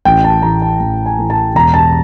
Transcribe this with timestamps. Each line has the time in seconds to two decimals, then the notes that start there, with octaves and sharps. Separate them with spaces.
0.05 A1 G5
0.24 A5
0.42 A2 E3 A#5
0.62 A5
0.80 A1
1.06 G#5
1.19 A2 E3
1.30 A5
1.55 E1 A#5
1.74 A5